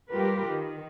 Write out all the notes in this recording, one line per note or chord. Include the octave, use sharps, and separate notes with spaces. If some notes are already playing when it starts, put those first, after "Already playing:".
G3 F4 G4 A#4 B4
D#3